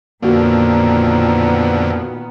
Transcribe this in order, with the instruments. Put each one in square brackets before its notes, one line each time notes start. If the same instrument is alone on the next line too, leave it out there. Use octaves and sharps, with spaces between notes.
[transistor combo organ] F2 D3 [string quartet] A#2 D#3 B3 [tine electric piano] A#3 F#4